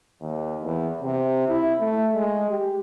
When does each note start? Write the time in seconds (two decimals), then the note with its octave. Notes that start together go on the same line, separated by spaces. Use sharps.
0.21 D#2
0.62 E2
1.02 C3
1.48 E4
1.80 A3
2.14 G#3
2.50 G4